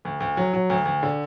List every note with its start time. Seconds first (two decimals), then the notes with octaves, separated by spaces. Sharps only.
0.05 D2
0.20 D2
0.37 F#3
0.53 F#3
0.70 D2
0.85 D2
1.03 D3